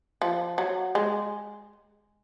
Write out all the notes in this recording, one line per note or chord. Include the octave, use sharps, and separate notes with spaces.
F3
F#3
G#3